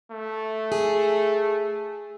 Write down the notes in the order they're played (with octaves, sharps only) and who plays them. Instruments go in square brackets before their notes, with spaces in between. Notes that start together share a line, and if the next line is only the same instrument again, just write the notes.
[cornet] A3
[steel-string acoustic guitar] G#4